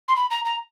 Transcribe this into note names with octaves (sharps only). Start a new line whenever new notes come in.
C6
B5
A#5
A#5